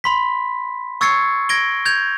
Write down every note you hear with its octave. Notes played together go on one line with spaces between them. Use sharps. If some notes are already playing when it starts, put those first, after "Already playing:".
B5 C6 B6
C#6 E6 G#6 A6 C7 C#7
G#6 A#6 D7 G7
G6 G#6 F7